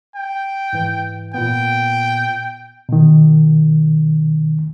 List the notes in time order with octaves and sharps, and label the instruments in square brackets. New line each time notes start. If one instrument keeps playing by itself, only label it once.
[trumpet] G5
[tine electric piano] G#2 E3
[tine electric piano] A#2 B3 [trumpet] G5
[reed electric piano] B2 D#3